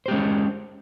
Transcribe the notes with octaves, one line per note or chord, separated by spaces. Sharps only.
G#3 C#4 G4 C5